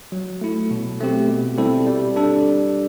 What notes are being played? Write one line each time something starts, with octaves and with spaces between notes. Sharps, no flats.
F#3
A3 E4
B2
A3 C4 G4
B2
G3 C4 E4 A4
G3
D4 A4